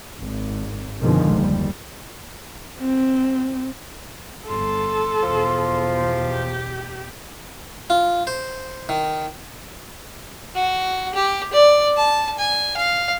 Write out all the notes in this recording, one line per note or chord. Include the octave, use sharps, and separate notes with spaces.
G#1
F#2 B2 D3 D#3 F3 G#3
F#1 D#2 G3
C4
G1 A4 C6
E2 B2 F3
G4
F4
C5
D#3
F#4
G4
D5
A5
G#5
F5